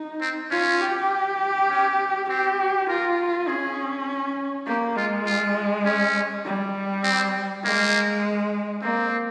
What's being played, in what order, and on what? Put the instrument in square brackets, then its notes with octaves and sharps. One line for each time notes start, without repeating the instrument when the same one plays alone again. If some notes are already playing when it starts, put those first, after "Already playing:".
Already playing: [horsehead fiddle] D#4
[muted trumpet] C4
[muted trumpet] C#4 [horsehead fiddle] F4
[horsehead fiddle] G4
[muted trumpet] C#4
[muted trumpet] C4 [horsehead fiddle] G4
[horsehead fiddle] F4 [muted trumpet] A#4
[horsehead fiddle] C#4 [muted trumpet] G#4
[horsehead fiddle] A#3 [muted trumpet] G4
[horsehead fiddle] G#3 [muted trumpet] F4
[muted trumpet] F4
C#4
[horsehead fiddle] G3
[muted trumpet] C4
[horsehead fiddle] G#3 [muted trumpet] A#3
[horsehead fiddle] A#3 [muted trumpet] C4